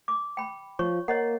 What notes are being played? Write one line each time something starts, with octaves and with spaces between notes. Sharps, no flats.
D6
G5 B5
F3 C#5 C#6
A#3 C#5 D#5 F#5